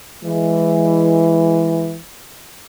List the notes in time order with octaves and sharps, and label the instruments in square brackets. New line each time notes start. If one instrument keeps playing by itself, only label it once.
[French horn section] E3 G#3